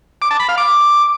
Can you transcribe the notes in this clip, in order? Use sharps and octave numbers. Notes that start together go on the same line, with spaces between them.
D6
A5
B5
F5
D6